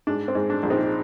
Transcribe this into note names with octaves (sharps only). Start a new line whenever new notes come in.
G#2 D4
C4
G#2
D4
A#1
C4 D#4